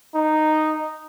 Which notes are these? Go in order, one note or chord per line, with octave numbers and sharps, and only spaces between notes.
D#4